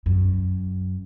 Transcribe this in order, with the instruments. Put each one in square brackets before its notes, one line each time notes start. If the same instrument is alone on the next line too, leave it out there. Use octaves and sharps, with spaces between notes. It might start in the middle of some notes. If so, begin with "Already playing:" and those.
[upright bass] F#2